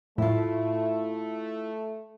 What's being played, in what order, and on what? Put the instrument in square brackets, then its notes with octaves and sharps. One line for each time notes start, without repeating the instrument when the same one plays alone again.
[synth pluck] A2 [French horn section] A3 [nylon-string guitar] E4 F4